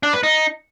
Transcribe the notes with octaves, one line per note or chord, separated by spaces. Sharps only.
D4
B4
D#4